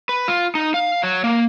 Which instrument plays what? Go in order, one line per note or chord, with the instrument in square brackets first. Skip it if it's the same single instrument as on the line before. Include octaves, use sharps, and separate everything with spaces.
[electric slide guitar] B4
F4
D#4
F5
F#3
A#3